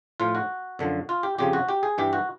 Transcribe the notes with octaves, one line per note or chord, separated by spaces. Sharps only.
A2 F3 F4
F#4
F#2 D3 F3
F4
G4
F2 C#3 F3 G4
F#4
G4
G#4
G2 E3 G4
F#4